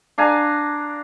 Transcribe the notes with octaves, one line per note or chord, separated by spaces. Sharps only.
D4 F5 G#5 A#5